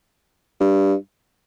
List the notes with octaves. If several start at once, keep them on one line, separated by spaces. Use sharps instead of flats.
G2